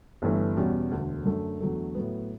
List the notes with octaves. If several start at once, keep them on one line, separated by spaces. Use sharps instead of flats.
G1 G2 E3 A3
E2 B2 G3 C#4
E1 D2 D3
F#2 D3 A3
E2 D3 F#3 A3
A2 F#3 B3